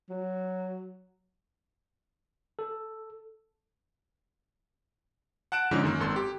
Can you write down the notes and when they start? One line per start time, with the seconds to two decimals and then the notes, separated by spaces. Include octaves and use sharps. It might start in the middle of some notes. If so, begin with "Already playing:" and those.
0.10 F#3
2.59 A4
5.52 F#5 A5 F#6 D7 E7
5.71 G#2 D3 F3 G#3 C#4 D#4
5.84 F#2 D#3 A#3
6.00 G#1 A4 C6
6.16 G4